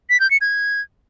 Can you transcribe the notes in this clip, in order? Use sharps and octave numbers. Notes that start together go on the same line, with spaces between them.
B6
G6
C#7
G#6